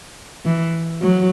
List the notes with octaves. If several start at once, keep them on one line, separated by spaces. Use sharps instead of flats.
E3
F#3